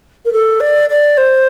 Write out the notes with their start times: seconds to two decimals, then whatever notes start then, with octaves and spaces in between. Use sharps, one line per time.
0.25 A#4
0.32 A4
0.60 D5
0.89 D5
1.17 C5